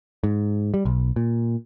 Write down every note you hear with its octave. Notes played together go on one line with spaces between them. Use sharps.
G#2
G3
B1
A#2